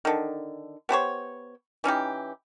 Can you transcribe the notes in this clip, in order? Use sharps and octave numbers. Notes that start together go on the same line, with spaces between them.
D3 D#3
B3 G4 C5 C#5
E3 C#4 D#4 G4